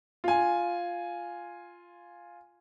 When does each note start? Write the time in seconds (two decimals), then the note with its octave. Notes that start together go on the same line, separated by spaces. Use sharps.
0.24 F4 G#5